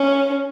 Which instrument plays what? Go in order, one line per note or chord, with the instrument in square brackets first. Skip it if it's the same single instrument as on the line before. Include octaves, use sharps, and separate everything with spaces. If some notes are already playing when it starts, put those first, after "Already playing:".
Already playing: [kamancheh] C#4